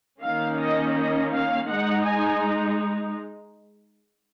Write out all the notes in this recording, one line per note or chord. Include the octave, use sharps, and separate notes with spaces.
D#3 A#3 C#4 F5
D#5
D#5
F5
G#3 D#4 F#5
G#5